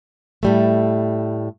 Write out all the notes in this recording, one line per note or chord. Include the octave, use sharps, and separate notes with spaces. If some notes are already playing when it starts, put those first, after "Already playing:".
A2 G3 A3